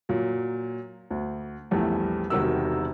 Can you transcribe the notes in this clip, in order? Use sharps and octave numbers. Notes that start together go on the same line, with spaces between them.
A#2 F#3
D2
A#1 E2 G3 A3
E1 C3 D#3 F#4 A#4 E6